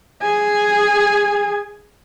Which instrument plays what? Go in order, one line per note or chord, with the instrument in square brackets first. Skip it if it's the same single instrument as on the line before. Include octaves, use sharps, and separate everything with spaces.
[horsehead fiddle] G#4 G#5